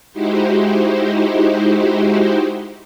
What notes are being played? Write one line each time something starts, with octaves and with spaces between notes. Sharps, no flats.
G#3 D#4 E4 F#4 G4 C5